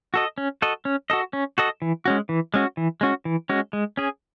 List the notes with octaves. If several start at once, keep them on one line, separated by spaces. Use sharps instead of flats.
F#4 A4 D#5
C#4
F#4 A4 D#5
C#4
F#4 A4 D#5
C#4
F#4 A4 D#5
E3
G#3 C#4 F#4
E3
G#3 C#4 F#4
E3
G#3 C#4 F#4
E3
G#3 C#4 F#4
G#3
C#4 G#4